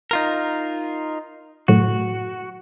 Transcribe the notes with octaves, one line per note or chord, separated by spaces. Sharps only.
D#4 F4 A#4
F#2 A2 F#4